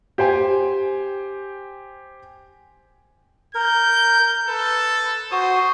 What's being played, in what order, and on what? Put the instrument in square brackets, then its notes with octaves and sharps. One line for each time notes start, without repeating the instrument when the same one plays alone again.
[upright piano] G4 C5 G5 G#5
[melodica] A#4 [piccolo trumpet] G6
[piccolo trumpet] A4 [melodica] B4
[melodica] F#4 D#6 [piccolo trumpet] C5